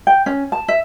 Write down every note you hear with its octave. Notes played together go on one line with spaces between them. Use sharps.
G5
C#4
A5
E5